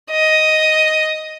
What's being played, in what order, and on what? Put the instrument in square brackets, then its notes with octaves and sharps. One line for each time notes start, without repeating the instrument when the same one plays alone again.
[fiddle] D#5